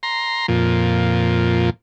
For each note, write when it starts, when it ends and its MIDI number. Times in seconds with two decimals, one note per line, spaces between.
0.03 0.46 82
0.03 0.46 84
0.48 1.70 41
0.48 1.70 46